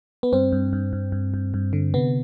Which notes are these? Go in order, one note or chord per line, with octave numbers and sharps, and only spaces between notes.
B3
G2 C4
G2
G2
G2
G2
G2
G2
D3
C3 B3